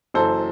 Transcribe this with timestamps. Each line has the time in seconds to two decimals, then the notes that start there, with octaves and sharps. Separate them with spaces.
0.14 F#1 F#2 E3 A4 C5